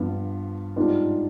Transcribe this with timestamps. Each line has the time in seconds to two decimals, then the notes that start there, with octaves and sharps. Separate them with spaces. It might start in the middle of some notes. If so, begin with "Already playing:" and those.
Already playing: G2 F3 B3
0.76 G#2 G3 B3 D4 F4